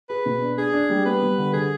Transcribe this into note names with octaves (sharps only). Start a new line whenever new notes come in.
G#4 B4
B2
D4
D4 G#4
D4
G3
B3 B4
G3
D3
D3 G#4